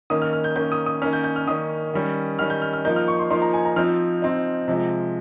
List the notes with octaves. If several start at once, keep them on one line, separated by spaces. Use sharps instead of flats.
D#3 A#3 C#4 D#6
F6
F6
G6
D#3 A#3 C#4 G6
D#6
D#6
D#3 A#3 C#4 F6
G6
G6
F6
D#3 A#3 C#4 D#6
D#3 G3 C#4
D#3 G3 C#4 F6
G6
F6
F6
F3 A#3 D#4 G6
F6
C#6
C6
F3 A#3 D#4 C6
A#5
G#5
A#5
F3 C4 D#4 F6
F3 C4 D#4
C3 F3 G#3